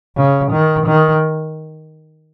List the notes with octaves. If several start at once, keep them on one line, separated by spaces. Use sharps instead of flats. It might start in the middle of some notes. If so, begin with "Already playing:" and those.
C#3
D#3
D#3